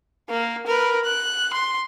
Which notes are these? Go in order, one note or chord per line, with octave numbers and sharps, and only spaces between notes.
A#3
A#4 B4
F#6
C6